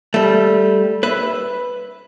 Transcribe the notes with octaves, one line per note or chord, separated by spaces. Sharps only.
G3 A3
B4 E5